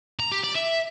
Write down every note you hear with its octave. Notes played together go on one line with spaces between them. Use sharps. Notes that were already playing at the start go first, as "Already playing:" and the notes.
A#5
G4
D5
E5